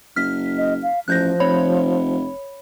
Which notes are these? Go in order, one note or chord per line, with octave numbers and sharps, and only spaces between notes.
F#1 F6 B6
D#5
F5
A1 F3 F#6 G6 A#6
F1 C#5 B5